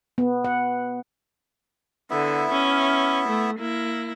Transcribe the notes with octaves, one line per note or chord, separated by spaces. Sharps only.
B3
F#5
D3 B3 E4 E5
C#4
A3
A#3 E4